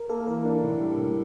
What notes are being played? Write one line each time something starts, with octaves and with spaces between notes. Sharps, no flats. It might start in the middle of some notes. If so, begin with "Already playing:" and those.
Already playing: A#4
A#3 A4
E3 A#4
D4
A2
G3
A2